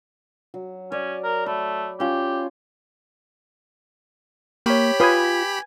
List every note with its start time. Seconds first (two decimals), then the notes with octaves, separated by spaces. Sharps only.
0.54 F#3
0.92 C#4 D5
1.24 A#4
1.46 A3 B5
2.00 C#4 F4 G4
4.66 A#3 G4 C#5 B5 C#6
5.00 F4 B4 G#5 D#6 G#6